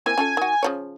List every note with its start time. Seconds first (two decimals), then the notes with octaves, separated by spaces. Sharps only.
0.06 A#3 C4 E4 G#5
0.18 C#4 F4 A4
0.37 D#3 F#4
0.63 C#3 F3 C#5